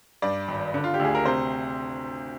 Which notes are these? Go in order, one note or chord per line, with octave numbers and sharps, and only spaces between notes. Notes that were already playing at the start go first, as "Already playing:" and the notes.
G2 D5
G#1
D3
F4
G4
D2 G#4
A#4
C3 C5